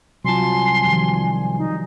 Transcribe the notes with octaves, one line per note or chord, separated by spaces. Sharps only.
C2 F#3 F4 G#5 A5 C6
D#3 F3 G3
D#4